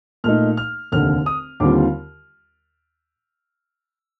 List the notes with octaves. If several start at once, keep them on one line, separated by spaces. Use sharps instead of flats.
A#2 A3 D#4 F6
F6
F1 D#2 D3 F6
D#6
D#2 D3 G3 C4 F4 D6